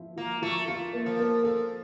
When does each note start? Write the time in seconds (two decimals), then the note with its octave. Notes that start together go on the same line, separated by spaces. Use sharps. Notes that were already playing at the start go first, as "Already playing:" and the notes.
Already playing: F3 E4
0.16 F3 A#3
0.42 F3 A3
0.68 A3 F4
0.93 A#3
1.06 F3
1.19 A#3
1.44 F3 A4